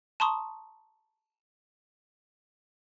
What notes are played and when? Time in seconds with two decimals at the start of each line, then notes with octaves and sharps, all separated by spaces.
0.20 A5 A#5 C6 C#6 D#6